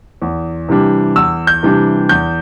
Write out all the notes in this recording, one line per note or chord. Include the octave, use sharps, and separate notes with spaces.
E2
C3 E3 G3 D4
E2 E6
G6
C3 E3 G3 D4
E2 G6